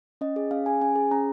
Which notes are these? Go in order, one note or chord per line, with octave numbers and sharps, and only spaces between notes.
C#4 D#5
G#4
C#4 F5
G#4 G#5
C#4 G#5
G#4
C#4 A#5